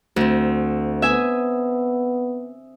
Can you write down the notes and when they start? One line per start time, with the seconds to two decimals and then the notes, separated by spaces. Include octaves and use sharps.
0.16 D2 C4
1.02 B3 E5 G#5 D#6